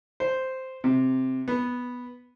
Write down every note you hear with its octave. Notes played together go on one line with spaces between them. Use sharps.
C5
C3
B3